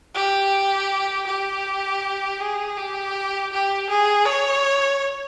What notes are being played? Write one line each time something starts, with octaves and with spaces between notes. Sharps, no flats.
G4
G4
G#4
G4
G4
G#4
C#5